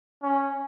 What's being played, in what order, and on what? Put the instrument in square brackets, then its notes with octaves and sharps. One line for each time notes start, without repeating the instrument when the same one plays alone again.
[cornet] C#4